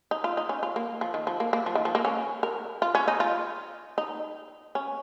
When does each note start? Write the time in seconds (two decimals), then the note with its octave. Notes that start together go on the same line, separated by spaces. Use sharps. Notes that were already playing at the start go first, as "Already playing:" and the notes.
0.11 D#4
0.24 F4
0.37 D#4
0.49 C#4
0.63 F4
0.76 A#3
1.01 F3
1.14 D#3
1.27 F3
1.40 A#3
1.53 A#3
1.66 F3
1.75 D#3
1.85 F3
1.95 A#3
2.05 C#4
2.43 A#4
2.82 F4
2.95 C#4
3.08 D#4
3.20 F4
3.98 D#4
4.75 C#4